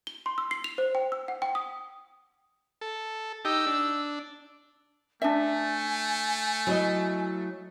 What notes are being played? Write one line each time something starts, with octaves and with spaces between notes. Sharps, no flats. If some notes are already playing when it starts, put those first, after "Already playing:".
G7
C6
E6
C7
F7
C5
G5
E6
F#5
G5
D#6
A4
D#4 G4 E6
D4
A3 D4 E5 G#5
F#3 E4 D#5